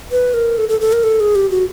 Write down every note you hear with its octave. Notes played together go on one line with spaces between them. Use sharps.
B4
A#4
A4
A4
A4
A#4
A4
G#4
G4
F#4